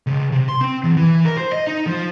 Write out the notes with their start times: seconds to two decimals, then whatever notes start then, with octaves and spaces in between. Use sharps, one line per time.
0.07 C#2
0.32 C3
0.49 C6
0.61 C4
0.84 E2
0.96 E3
1.25 A#4
1.37 C5
1.52 D#5
1.67 D#4
1.87 F3